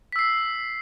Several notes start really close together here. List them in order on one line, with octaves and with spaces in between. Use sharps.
B6 E6 C7